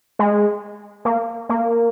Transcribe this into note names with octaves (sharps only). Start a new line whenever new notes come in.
G#3
A#3
A#3